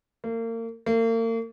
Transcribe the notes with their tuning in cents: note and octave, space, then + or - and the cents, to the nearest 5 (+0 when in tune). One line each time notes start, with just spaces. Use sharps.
A#3 -35
A#3 -40